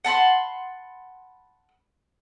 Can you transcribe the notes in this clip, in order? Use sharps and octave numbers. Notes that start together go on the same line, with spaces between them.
F#5 A5 B5 C6